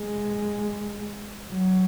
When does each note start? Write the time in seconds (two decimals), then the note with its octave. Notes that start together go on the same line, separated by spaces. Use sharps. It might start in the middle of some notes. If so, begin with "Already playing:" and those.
Already playing: G#3
1.49 F#3